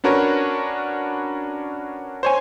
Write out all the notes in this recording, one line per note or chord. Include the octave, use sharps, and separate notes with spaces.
C#4 D4 F#4 A#4 B4 C#5
C5 C#5 G#5